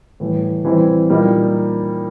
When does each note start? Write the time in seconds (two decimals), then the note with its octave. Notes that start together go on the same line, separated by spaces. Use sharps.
0.20 A2 E3 G3
0.65 E3 G3 C4 E4
1.10 A#2 G3 A#3 D#4